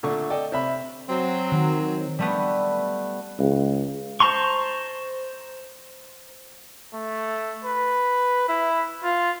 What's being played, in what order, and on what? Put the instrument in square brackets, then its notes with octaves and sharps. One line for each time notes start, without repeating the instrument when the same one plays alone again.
[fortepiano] A#2 D3 A3 C#6
A4 D5 D#5 G5
C3 E5 B5
[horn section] F#3 C4
[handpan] D#3
[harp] G3 A3 B3
[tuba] C#2
[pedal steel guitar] C5 A5 A#5 C6 C#6
[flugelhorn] A3
B4
E4
F4